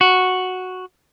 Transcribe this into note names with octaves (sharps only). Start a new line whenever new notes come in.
F#4